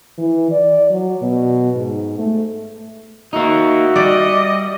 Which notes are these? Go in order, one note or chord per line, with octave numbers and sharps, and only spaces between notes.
E3
D5
F#3
B2
G#2
A3
A#3 D#4 F#4 E5
G3 D5 D#5